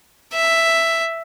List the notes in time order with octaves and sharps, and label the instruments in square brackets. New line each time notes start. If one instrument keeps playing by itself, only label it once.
[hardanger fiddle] E5